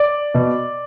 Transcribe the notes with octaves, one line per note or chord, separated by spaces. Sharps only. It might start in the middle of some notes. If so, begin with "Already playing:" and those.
Already playing: D5
B2